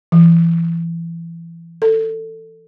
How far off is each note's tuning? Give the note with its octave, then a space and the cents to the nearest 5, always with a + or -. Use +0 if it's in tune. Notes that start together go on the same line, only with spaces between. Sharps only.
E3 +25
A4 +20